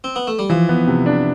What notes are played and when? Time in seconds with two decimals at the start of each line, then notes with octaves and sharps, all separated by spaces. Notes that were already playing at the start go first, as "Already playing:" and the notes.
0.04 C4
0.16 B3
0.27 A3
0.39 G3
0.50 E3 F3
0.69 B3
0.87 C3
1.06 D4